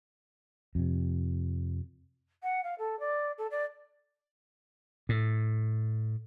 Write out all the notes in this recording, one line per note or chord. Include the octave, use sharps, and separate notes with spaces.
F2 C3
F#5
F5
A4
D5
A4
D5
A2